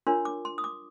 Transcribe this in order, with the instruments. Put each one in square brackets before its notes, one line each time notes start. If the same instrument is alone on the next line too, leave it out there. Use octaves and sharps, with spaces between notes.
[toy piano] D4 F4 A#4 C#5 C6
D6
C6
D#6
D6